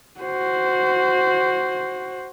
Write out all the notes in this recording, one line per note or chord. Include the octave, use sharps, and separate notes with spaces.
F#4 C5